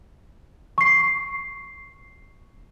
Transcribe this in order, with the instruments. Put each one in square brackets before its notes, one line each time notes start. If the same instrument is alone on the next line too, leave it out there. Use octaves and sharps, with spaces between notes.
[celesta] C#6 C7